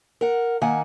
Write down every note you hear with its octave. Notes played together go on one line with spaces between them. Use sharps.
A#4 F#5
D#3 A#3 F#5 G#5